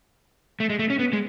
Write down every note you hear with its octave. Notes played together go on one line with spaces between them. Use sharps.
A3
G#3
A3
C#4
B3
G#3